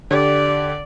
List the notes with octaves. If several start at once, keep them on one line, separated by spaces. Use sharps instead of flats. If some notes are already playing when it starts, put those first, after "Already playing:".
D3 G4 D5